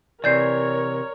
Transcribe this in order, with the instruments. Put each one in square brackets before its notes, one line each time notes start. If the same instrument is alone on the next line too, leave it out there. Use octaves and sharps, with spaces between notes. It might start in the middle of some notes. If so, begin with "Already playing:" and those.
[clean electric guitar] C3 E3 [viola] A#4 C#5 [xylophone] D5 G6 C7